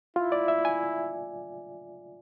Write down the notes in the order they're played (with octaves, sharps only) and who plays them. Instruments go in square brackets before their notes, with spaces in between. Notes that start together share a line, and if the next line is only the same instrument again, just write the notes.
[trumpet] E4 [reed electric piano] F4
[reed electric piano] D5
E5
G#5